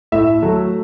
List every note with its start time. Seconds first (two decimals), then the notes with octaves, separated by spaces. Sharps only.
0.12 A2 E5
0.42 F#3 A3